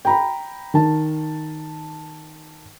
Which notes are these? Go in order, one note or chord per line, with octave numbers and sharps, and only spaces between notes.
G5 A#5 B5
D#3 A5